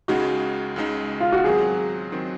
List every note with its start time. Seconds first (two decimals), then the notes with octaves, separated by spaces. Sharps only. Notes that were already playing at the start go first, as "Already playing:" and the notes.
0.08 C#2 C#3 G#3 D#4 F#4
0.76 C#2 C#3 G#3 D#4
1.20 F4
1.32 F#4
1.44 G#2 D#3 F#3 C4 G#4
2.12 D#3 F#3 C4